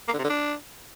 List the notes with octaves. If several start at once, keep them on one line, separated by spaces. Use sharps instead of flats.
A#3
D3
C3
D3
D4